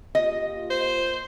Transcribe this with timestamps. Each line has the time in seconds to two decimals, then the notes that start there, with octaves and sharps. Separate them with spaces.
0.15 A#3 F4 G4 D#5
0.70 C5